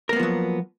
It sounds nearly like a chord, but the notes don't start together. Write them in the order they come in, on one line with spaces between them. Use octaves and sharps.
A#4 A#3 B3 F3 F#3